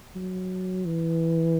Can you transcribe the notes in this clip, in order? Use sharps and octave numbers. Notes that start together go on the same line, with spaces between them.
F#3
E3